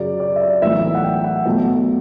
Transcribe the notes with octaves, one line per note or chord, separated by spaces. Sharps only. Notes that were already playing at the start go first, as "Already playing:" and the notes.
Already playing: F#2 C#3 F#3 D5
D5
E5
D5
B1 A2 E3 E5
F#5
G5
F#5
B1 B2 F#3 A3